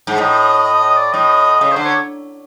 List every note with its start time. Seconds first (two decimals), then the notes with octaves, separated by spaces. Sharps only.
0.07 G#2
0.18 A2 D#5
0.65 D#5
0.81 D#5
0.97 D5
1.13 A2 D#5
1.61 C#3
1.72 D3 C5
1.84 C#5